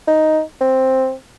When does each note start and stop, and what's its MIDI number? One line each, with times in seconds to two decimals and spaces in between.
0.07 0.41 63
0.61 1.13 60